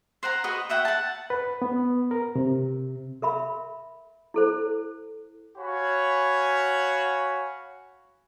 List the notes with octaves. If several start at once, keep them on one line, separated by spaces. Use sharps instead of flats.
C5 F#5 A#5
F#4 B4 D#5
F#4 E5 F#5 G5
F#5 A5
B4
B3
A#4
C3
A#4 E5 B5
E4 A4 C5
F#4 C#5 F5 G#5 B5